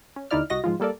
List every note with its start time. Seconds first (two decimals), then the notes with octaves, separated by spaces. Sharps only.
0.16 C#4
0.31 D#2 D3 D#4 E4 D5 F6
0.50 C2 F#4 D#5 A#6
0.64 G#2 F3 G#3 F4
0.80 G3 A#3 A4 A#4 D5